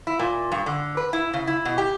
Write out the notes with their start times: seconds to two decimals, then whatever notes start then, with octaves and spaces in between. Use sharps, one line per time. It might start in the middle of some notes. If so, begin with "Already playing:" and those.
0.07 E4
0.20 A#2
0.52 G2
0.66 D3
0.97 B4
1.13 E4
1.33 C#3
1.47 E4
1.65 B2
1.78 G4